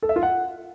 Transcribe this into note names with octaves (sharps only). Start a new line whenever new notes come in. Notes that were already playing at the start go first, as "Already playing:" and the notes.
A4
E5
F4
F#5